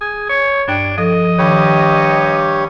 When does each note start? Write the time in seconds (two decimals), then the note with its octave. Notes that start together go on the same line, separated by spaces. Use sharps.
0.01 G#4
0.30 C#5
0.68 G2 D4 G5 G#6
0.98 F3 A4 D#5
1.38 G2 D#3 G4 C#5 B5